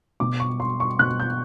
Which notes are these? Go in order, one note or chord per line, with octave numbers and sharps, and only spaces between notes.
B2 D6
C#6
C6
C#6
B2 F#6
G6